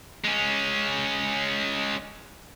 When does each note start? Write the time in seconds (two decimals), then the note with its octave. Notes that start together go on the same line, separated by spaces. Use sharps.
0.25 G#3 C#4